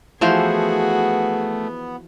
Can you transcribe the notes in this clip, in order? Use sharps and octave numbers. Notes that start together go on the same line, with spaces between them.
E3 F3 A3 B3 F#4 G#4 C5